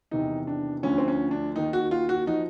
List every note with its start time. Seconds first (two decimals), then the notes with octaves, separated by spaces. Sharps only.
0.11 E2 C3 D#3 D#4
0.47 D4
0.83 D2 D3 F3 C#4
0.98 C4
1.08 C#4
1.31 D4
1.55 D#2 D#3 D#4
1.73 F#4
1.91 F4
2.09 F#4
2.27 F3 D#4